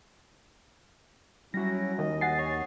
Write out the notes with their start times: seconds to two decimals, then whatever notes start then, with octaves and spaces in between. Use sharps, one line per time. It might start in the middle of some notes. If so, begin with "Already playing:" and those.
1.54 F#3 G3 C#4 E4 F#4 A#6
1.99 D#2 D#5
2.21 F#5 G#5 A6 C7
2.39 C#5